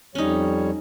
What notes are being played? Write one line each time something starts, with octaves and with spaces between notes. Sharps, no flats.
F2 G3 C#4 D#4 C#5